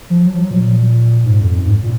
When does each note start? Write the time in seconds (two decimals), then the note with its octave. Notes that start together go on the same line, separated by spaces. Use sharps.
0.10 F3
0.26 F#3
0.35 F3
0.43 F#3
0.51 A#2
1.25 G#2
1.41 F2
1.58 F#2
1.66 G#2
1.83 A#2